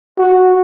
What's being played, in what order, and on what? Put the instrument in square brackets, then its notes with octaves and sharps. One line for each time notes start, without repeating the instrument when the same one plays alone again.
[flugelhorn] F#4